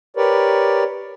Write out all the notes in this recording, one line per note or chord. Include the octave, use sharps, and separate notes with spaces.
G4 A#4 B4 C#5 D5